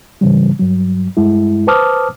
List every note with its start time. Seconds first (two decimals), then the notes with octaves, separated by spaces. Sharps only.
0.21 G#2 C#3 E3 G3
0.59 G2 F#3
1.17 G2 G#3 E4
1.67 B4 C5 A5 D6 D#6 F6